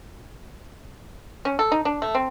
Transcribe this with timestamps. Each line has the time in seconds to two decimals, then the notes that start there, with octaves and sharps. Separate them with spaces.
1.45 C#4
1.59 A4
1.72 D#4
1.85 D4
2.02 A3
2.15 C4